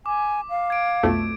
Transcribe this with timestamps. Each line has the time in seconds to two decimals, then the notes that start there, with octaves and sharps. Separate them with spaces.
0.06 G#5 D6
0.49 F5
0.70 G#6 D7
1.03 B1 F2 A3